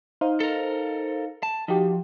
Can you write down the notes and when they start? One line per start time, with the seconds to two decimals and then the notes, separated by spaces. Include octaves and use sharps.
0.21 D#4 C5 F5
0.40 A4 A#4
1.43 A5
1.68 F3 D#4 F#4 G4